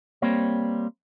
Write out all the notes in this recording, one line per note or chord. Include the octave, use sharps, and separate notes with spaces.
G3 A#3 C4 C#5